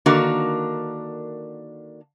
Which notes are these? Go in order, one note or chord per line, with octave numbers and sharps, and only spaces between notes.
D3 D#3 A#3 D4 F#4 A#4